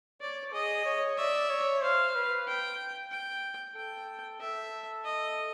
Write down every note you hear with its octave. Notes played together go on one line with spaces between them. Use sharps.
C#5 D5
G#4 D#5
C#5
D5 E5
C#5
C5 F5
B4
G5
G5
A4 G5
A4 E5
D#5